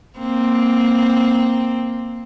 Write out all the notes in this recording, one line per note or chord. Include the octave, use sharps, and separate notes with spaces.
A#3 C4